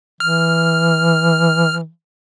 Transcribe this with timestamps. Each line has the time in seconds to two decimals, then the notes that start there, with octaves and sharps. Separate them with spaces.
0.20 E3 F6